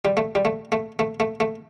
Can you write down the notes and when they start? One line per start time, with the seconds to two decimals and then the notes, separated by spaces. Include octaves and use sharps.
0.05 G3
0.17 A3
0.35 G3
0.45 A3
0.72 A3
0.99 A3
1.20 A3
1.40 A3